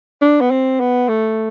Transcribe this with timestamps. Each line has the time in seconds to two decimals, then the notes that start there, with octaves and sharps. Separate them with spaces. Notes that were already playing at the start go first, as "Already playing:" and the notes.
0.22 D4
0.41 B3
0.51 C4
0.80 B3
1.08 A3